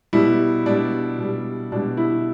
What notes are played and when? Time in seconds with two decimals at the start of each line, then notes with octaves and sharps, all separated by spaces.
0.13 B2 G3 E4
0.66 B2 G3 D4
1.18 B2 G3
1.72 B2 D4
1.76 G3
1.97 E4